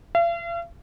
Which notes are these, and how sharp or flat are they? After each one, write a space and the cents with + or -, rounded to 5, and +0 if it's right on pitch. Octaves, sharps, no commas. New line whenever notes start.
F5 -45